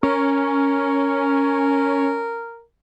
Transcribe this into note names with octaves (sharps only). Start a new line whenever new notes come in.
C#4 A#4